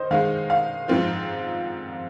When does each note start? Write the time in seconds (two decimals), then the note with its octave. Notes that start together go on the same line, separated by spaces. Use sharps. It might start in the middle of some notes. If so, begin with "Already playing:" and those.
Already playing: D#3 C5 D#5
0.11 D#3 G#3 D#4 F5
0.50 F5
0.88 G#2 F3 C4 F4